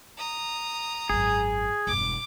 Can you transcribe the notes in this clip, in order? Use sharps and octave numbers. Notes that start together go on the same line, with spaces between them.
A#5 D#6
G#1 F#2 G#4
E1 G2 D6